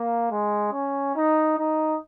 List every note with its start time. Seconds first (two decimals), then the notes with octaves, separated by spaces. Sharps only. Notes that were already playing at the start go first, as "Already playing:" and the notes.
Already playing: A#3
0.31 G#3
0.72 C#4
1.15 D#4
1.57 D#4